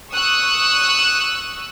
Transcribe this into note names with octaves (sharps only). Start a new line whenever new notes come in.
C#6 D#6 E6 F#6